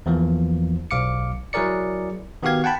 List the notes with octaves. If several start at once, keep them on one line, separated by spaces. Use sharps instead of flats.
E2 E3 F3 A#3
B1 F5 D6 C#7
F#3 E4 G#4 A#4 D5 C#7
D#3 B3 F#4 G4 F5 G#6
F#5 G5 A5 B5